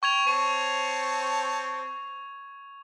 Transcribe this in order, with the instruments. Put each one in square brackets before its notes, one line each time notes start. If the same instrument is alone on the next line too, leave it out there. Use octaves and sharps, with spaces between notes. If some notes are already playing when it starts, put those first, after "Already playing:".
[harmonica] G5 [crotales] C#6 G#6 F7
[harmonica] C4 C#5 A5